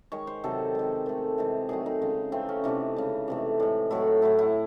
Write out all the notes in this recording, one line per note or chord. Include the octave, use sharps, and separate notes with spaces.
D#3 G#3 C#5
C5
C3 D#3 F#3 A4
D#3 G#3
D#3 A3
C3 E3 G#3
D#3 F#3 A3 G#4
D#4
C#3 G#3
C#3 E3 A3 C4
C#4
C3 E3 A3 D#4
C#3 G#3
C3 E3 A3
A2 G#3
A2 F#3 A3 E4
A2 F#3 A3 E4
E4